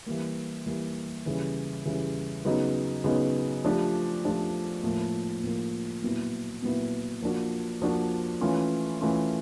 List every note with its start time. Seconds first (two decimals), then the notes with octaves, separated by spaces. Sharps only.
0.06 E3 G3 A#3
0.66 E3 G3 A#3
1.26 C#3 E3 G3
1.86 C#3 E3 G3
2.45 C#3 F#3 B3 D#4
3.04 C#3 F#3 B3 D#4
3.64 F3 A3 D4 G4
4.24 F3 A3 D4 G4
4.83 A2 F3 A#3
5.43 A2 F3 A#3
6.03 A#2 F#3 B3 E4
6.62 A#2 F#3 B3 E4
7.22 F3 A#3 D4 F#4
7.82 F3 A#3 D4 F#4
8.41 E3 A3 C#4 F4
9.01 E3 A3 C#4 F4